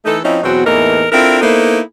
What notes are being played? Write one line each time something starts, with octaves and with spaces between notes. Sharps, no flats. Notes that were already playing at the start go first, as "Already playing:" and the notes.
E3 A3 D#4 A4
F3 C4 C#4 D#4 E4
E2 B2 F#3 C4 F#4
E2 A2 E3 A#3 D#4 A#4
C4 D4 E4 F4 A4 A#4
A#3 B3 D#4 E4 A4 C5